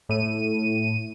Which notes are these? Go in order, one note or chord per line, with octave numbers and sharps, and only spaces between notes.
A2 D#7